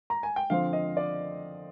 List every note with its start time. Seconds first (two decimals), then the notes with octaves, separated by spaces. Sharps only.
0.10 A#5
0.23 G#5
0.36 G5
0.50 D3 F3 C4 F5
0.73 D#5
0.97 D5